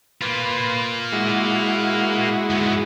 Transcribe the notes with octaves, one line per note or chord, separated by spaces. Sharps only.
A#3 F4 B4 C6
G#3 E4 F#4
G#2 B3